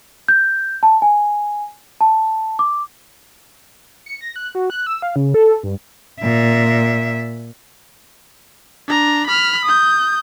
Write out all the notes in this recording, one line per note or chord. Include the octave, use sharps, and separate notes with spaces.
G6
A5
G#5
A5
D6
C#7
A#6
F#6
F#4
F#6
E6
F5
C#3
A4
G2
A#2 E5
D4 A#5
B5 F6
D#6 G6